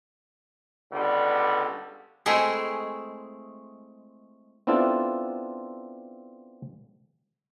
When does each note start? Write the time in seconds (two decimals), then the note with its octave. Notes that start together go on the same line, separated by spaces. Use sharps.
0.92 C#2 D3 G3 B3
2.26 G#3 A3 C4 E4 G#4
4.67 B3 C4 D4 E4 F4 A4